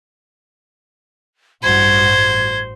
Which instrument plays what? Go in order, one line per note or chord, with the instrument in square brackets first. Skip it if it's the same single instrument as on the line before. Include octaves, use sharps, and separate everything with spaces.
[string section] A1 G2 F#4 [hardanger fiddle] C5 [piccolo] G#6